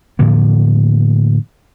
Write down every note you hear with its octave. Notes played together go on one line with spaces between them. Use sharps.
A2 D3 F3 A#3